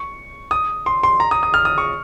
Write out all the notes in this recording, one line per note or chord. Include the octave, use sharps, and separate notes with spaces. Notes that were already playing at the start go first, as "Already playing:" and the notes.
Already playing: C#6
D#6
C6
C6
A#5
D#6
D#6
F6
D#6
C#6